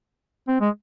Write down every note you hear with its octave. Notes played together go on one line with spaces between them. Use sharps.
C4
G#3